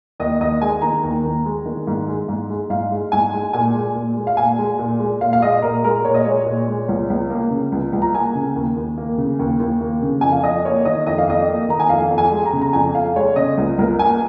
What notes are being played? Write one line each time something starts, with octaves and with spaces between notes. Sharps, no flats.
D#2 D#5
D#2 D#5
G#3 G#5
D#3 A#5
D#2
D#2
G#3
D#3
G#2
G#3
G#2
G#3
G#2 F5
G#3
G#2 G#5
G#3
A#2 G#5
G#3
A#2
G#3
F5
A#2 G#5
G#3
A#2
G#3
A#2 F5
F5
G#3 D#5
A#2 A#4
G#3 A#4
A#2 C#5
D#5
G#3 C#5
A#2
G#3
C#2
C#2
A#3
C#3
C#2
C#2
A#5
A#3 G#5
C#3
D#2
D#2
A#3
C#3
D#2
D#2
A#3
C#3
F2 G#5
F5
F2 D#5
A#3 C#5
D#3 D#5
F2 D#5
F5
F2 D#5
A#3
D#3 A#5
G#5
F2 F5
F2
G#5
G#3
A#5
C#3
A#5
F2 G#5
F2 F5
G#3 C#5
C#3 D#5
C#2
C#2 A#4
A#3 G#5